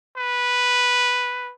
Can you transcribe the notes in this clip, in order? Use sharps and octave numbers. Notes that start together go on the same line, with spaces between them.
B4